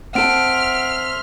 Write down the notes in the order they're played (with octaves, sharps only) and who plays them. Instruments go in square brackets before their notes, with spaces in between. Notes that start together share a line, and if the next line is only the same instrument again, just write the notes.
[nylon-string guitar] C4 A4 [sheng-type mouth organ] E5 C6 [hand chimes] F#5 D7 [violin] F6